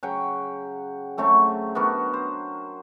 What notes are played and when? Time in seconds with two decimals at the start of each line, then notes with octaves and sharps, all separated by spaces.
0.03 C#3 F#3 F#5 G5
1.18 C#3 F#3 A3 C4
1.75 B3 D4 F#4 A#4
2.14 C5